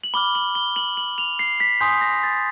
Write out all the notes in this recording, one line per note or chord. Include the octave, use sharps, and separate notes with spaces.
F#7
B5 D6 F6 G7
F#7
G7
F#7
F#7
F7
C7
B6
G#5 C6 D#6 G6 B6
A#6
A6